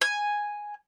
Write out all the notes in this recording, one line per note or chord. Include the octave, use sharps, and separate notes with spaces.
G#5